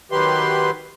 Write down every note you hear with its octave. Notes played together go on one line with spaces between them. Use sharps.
D#3 F#3 G4 B4 C6